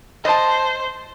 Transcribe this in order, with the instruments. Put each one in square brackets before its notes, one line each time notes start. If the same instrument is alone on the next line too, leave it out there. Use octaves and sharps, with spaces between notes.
[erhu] C5 [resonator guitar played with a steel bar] D#5 A5